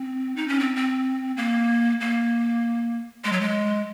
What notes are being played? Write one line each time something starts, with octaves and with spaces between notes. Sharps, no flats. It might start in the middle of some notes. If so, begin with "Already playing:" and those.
Already playing: C4
D#4
C#4
C4
C4
A#3
A#3
G#3
F#3
G#3